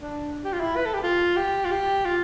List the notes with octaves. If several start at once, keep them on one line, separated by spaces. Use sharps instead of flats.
D4
G4
F4
E4
B4
A4
G4
F4
G4
F4
G4
F4